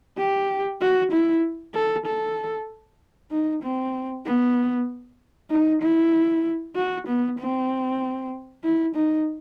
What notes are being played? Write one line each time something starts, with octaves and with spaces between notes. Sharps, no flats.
G4
F#4
E4
A4
A4
D#4
C4
B3
D#4
E4
F#4
B3
C4
E4
D#4